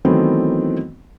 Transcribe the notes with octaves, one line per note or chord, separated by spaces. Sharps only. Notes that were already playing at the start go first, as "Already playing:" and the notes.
D#3 E3 F#3 A3 B3 C4